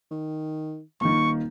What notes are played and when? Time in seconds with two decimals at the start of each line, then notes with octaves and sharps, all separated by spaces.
0.11 D#3
1.01 D#1 D#3 A#3 C#6